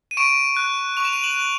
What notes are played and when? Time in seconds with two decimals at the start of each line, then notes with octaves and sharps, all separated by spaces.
0.11 D#7
0.17 C#6 D7 E7
0.57 F#6
0.97 C#6 F7
1.05 E7
1.13 D#7 F7
1.24 E7 F#7
1.36 F#6